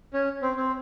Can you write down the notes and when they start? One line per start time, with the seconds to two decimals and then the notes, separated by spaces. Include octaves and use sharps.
0.14 C#4
0.42 C4
0.57 C4